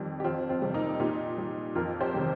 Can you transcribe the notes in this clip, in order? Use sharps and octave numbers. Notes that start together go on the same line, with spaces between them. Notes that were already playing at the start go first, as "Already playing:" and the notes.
Already playing: F2 D#3 G3
G4
F2 C4 F4
C4 F4
C3 G3
A#3 D#4
A#2 D#4 G4
G3
F2 F4 A#4
G4 C5
C3 D#3 G3